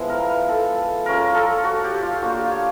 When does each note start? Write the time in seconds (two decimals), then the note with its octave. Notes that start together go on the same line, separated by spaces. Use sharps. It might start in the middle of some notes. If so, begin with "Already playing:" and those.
Already playing: F3 G#3 B3 E4
0.09 A#4
0.30 B4
0.49 A4
1.06 G#3 C#4 F4 A#4
1.35 A4
1.64 F#4
1.84 G4
2.03 F4
2.22 A#3 D4 F4 F#4
2.37 G4
2.51 C#5